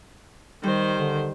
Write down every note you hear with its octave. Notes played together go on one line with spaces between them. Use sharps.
D#3 G3 C5
D3